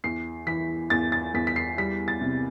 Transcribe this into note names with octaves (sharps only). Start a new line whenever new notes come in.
E2 C7
E3 B6
E2 A6
A6
E2 B6
B6
C7
G3 B6
A6
C3